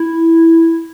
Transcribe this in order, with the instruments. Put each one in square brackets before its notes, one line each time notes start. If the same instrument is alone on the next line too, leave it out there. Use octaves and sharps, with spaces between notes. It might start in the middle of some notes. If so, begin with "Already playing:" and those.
Already playing: [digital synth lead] E4